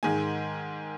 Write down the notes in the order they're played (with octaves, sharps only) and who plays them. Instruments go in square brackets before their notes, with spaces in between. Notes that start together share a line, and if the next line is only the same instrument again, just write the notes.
[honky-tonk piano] G#2 D#3 G#3 G#5